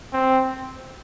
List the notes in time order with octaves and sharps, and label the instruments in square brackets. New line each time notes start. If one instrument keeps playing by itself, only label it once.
[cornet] C4